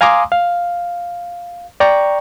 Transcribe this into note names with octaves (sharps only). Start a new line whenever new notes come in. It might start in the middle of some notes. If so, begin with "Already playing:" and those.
F5 G#5 A#5 C6 D6 D#6
F5
D5 G5 A#5 C#6